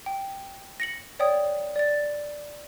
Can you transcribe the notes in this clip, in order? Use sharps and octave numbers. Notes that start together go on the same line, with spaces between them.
G5
A#6 C#7 F#7
C#5 D5 G5 D#6
D5 A6